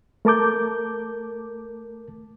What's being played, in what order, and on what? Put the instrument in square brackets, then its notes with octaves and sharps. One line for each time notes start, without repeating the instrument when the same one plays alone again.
[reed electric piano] A3 A#4 A5 D6 G6